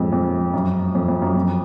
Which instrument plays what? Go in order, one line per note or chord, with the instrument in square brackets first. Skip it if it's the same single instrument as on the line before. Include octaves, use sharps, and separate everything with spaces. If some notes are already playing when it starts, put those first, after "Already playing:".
Already playing: [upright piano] F2 G#2
F2
F#2
F2
F2
F#2
F2